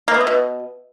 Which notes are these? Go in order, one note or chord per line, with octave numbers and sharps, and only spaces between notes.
A#3
B3
A3
B2